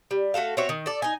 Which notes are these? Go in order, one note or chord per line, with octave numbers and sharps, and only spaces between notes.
G3
A3 F#4 A4 F5
C4 F#4 C#5 E5
D#3
A4 D5
D#4 G#5